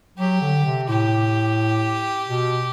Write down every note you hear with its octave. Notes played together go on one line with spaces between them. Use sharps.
F#3 G4
D3
C3
A2 G4
B2